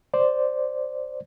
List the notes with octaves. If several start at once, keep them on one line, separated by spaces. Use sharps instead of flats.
C5 D5